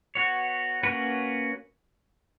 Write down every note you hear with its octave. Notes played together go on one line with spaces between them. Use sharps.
B3 F#4 C#5
A#3 C#4 F#4 B4